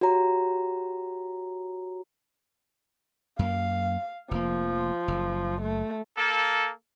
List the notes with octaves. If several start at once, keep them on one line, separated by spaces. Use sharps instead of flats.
F#4 G4 C#5 A#5
F#2 A#3 F5
F1 F3 A#3
F#1
A3
A#3 A4